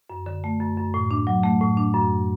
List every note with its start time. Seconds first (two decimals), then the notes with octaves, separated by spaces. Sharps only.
0.10 F#2
0.26 D3
0.44 A3
0.60 F#2
0.77 F#2
0.94 A2
1.11 D4
1.27 F#3
1.44 A3
1.61 A2
1.77 D4
1.94 F#2